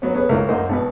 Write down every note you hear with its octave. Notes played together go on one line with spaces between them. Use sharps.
F#3 B3 C#4
B3 C#4 G#4 B4
C#2 A#3 E4 C5
F#2 A#3 C5 D#5
G#1 B2 B4